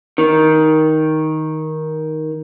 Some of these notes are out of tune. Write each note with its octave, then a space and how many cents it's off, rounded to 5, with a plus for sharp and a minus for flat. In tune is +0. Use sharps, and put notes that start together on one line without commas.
D#3 +10